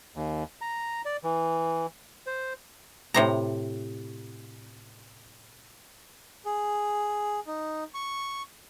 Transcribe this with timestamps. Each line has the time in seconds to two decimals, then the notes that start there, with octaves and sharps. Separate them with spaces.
0.16 D#2
0.61 A#5
1.05 D5
1.24 E3
2.26 C5
3.14 A2 C3 A#5
6.46 G#4
7.47 D#4
7.94 C#6